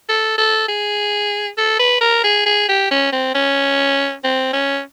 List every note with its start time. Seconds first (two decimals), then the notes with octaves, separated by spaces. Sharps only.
0.09 A4
0.38 A4
0.68 G#4
1.58 A4
1.79 B4
2.01 A#4
2.24 G#4
2.46 G#4
2.69 G4
2.91 C#4
3.12 C4
3.35 C#4
4.24 C4
4.53 C#4